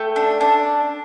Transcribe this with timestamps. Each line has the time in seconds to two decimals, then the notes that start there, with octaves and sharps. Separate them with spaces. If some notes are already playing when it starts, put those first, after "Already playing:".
Already playing: A3 G5
0.16 D4
0.41 D4